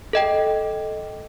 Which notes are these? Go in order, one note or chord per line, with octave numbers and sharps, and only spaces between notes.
A4 D#5 G5